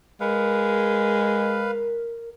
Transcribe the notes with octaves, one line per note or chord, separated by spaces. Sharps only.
G#3 A#4 B4 F5